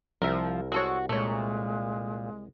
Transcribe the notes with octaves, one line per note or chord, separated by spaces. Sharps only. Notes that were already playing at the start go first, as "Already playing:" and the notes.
C2 F3 A#4 E5
G#3 F#4 A4 C#5
A#2 G#3 A3 C#5